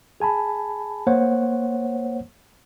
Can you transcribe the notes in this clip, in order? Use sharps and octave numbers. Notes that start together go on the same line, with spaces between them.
G#4 G#5 A5 B5
A#3 C5 C#5 F#5